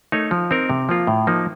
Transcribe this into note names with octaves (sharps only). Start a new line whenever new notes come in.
A3 D#4 A#4 C#5
F3
C4 D#4 A#4
C3
F3 A#3 F4
A2
F3 A#3 D#4